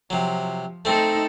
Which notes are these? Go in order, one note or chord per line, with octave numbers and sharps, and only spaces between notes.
C3 F3 F#3
A3 C4 D#4 A4